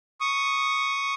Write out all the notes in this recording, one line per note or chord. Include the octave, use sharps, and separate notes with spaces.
C#6 D#6